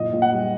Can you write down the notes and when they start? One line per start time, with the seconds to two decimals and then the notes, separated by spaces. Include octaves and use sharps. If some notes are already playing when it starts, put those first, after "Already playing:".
Already playing: F#1 A#2 D#5
0.13 A#2
0.22 F#5
0.33 G3